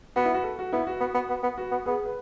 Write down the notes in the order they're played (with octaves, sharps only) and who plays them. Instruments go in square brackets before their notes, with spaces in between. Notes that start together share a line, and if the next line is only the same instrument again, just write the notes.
[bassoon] B3 [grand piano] F#4
[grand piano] E4
F#4
A4
F#4
[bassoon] B3 [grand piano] E4
[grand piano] F#4
[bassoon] B3
B3
B3
B3
[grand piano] F#4
[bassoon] B3
[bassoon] B3 [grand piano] G#4
[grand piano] B4